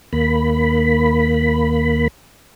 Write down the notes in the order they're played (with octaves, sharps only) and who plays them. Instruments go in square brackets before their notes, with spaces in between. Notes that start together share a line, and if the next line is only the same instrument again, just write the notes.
[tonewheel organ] D#2 A#3 B5